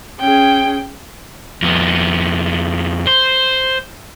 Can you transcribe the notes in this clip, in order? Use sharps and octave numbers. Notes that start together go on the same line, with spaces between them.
C#4 G#4 G5
F2 B3
C5